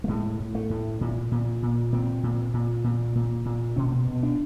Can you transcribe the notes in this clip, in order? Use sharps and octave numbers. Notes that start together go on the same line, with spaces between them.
A3
A2 G#3
A2
A3
A2
A#2
A#2
A#2
A#2 C4
A#2
A#2
A#2
A#2
A#2
B2 C#4
B2
D4